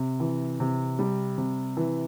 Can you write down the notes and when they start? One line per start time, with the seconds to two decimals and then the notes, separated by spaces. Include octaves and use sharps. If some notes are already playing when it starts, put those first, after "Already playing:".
Already playing: C3
0.20 E3
0.60 C3
0.99 G3
1.38 C3
1.77 E3